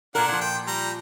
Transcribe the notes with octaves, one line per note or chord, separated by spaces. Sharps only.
A#2 D4 A#4 F#5
A#2 F3
G5
G3 A#5